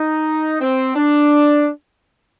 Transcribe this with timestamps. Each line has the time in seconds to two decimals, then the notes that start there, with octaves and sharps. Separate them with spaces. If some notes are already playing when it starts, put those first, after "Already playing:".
Already playing: D#4
0.60 C4
0.95 D4